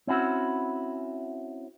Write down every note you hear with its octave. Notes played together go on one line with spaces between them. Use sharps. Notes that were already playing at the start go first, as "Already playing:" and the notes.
C4 C#4 E4 F#4